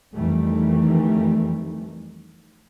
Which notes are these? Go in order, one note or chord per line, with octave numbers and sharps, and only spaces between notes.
F2 D#3 E3 G3 A3